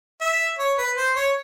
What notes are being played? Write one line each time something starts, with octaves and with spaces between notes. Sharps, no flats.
E5
C#5
B4
C5
C#5